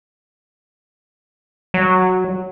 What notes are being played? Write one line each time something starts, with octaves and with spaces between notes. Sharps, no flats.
F#3